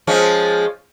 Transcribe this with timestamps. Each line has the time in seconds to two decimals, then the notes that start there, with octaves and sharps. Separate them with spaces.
0.07 F3 G#3 C#4